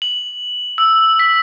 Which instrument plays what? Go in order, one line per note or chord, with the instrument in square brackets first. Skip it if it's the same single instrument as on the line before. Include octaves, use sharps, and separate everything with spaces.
[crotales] F#7
E6
B6